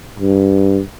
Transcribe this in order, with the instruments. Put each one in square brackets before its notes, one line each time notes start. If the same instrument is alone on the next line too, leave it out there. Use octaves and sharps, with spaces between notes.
[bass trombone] G2